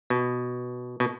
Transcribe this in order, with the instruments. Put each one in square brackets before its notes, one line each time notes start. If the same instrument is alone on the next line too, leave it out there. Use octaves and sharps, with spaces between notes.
[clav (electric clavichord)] B2
B2